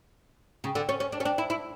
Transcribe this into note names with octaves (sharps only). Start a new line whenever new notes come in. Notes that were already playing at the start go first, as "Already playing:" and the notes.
C#3
D3
C#4
C#4
D4
C#4
D4
E4
E4